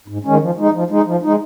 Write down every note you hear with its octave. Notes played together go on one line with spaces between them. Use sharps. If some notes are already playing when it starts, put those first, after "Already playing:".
G#2
D#3 G#3 C#4
F3
G#3 D#4
F3
G#3 D#4
F3
G#3 D#4